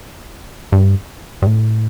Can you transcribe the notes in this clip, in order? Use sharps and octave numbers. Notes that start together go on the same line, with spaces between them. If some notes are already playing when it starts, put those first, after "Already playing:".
G2
G2
A2